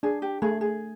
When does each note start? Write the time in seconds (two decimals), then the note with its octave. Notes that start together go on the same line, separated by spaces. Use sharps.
0.03 D4 G#4
0.22 G4
0.42 A3 G#4
0.61 G#4